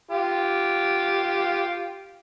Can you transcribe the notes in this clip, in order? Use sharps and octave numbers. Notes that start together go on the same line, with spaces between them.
F4 G4